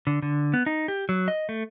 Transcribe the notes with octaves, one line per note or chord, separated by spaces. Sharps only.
D3
D3
B3
D#4
G4
F#3
D#5
A3